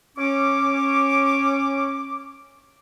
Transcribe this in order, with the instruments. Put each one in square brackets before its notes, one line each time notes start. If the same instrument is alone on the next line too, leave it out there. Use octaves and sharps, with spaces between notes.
[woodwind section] C#4 D6